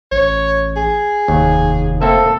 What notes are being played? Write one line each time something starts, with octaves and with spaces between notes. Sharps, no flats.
A1 C#5
G#4
F1 D#2
A#3 C4 A4 E5